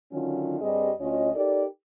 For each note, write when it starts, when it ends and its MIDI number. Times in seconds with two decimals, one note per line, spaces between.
0.11 0.59 50
0.11 0.59 51
0.11 0.59 54
0.11 0.59 61
0.11 0.59 65
0.60 0.90 43
0.60 0.90 55
0.60 0.90 60
0.60 0.90 68
0.60 0.90 75
0.98 1.31 38
0.98 1.31 61
0.98 1.31 65
0.98 1.31 73
0.98 1.31 75
1.34 1.63 63
1.34 1.63 67
1.34 1.63 69
1.34 1.63 70
1.34 1.63 74